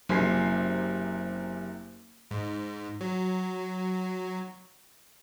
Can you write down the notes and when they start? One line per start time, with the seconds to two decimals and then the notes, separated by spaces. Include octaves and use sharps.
0.09 F#1 C3 G#5 C7
2.31 G#2
3.01 F#3